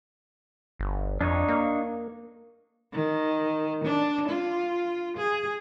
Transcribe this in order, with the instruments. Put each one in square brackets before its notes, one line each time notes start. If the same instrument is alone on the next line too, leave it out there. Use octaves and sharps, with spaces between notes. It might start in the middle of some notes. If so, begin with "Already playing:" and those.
[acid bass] G1
[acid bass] F2 [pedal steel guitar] D4 D#4 C#5
[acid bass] A#3
[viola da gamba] D#3
D4
F4
G#4